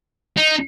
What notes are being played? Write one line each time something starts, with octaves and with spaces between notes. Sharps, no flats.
D#4